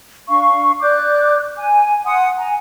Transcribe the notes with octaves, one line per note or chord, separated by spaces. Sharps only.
D4 F5 C#6
D5 D6 F#6 G6
G#5
F#5 G#5 C6 D#6
G#5 A#5